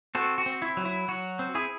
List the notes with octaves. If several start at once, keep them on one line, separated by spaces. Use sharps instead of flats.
C4 F#4 A4
F#4
C4
E4
F#3
E4
F#3 F#4
C4
E4 G#4